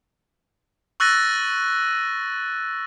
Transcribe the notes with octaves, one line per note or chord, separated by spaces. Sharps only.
C#6 E6 F#6 A6 A#6 D#7